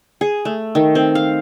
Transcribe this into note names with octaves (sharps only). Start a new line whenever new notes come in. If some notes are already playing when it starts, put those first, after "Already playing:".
G#4
A3
D#3
C4
F5